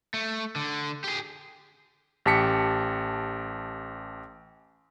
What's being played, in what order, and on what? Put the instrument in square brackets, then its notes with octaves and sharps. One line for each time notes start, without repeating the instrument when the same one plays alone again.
[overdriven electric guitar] A3
D3
G4 G#4
[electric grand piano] A1 G4 A5 B6 C#7